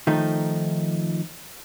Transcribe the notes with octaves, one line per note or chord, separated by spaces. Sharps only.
D#3 F3 A3 D#4